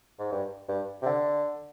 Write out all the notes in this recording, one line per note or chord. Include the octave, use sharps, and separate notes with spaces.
G#2
G2
G2
C3
D3